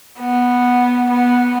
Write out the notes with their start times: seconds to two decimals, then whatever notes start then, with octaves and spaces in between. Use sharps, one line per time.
0.19 B3
1.09 B3